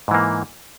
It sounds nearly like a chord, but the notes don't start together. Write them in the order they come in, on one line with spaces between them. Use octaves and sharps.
G#2 E3 A#3